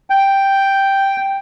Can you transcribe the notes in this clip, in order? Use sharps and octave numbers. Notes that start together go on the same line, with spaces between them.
G5